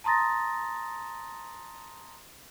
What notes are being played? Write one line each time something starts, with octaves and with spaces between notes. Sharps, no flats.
A5 A#5 C6 D#6 A6 A#6